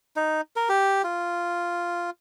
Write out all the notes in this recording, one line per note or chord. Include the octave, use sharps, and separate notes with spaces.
D#4
A#4
G4
F4